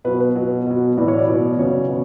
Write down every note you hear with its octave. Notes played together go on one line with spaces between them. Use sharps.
B2 F#3 B4
B4
B2 F#3
B2 F#3
A2 E3 D5
C#5
D5
B2 F#3
C#3 F#3 C#5
B2